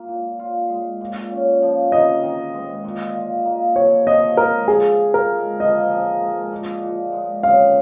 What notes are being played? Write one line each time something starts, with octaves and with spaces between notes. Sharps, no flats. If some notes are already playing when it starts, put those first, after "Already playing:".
Already playing: A#3 F4
A#2
F4
G#3
A#2
C#4
F3
D#3 D#5
D#3
G#3
A#2
F4
A#3
F3 C#5
F3 D#5
G#3 A#4
F3 G#4
F3
A#4
G#3
F3 D#5
F3
G#3
A#2
A#2
G#3
C#3 F5